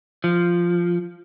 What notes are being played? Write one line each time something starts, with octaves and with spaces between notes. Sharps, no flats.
F3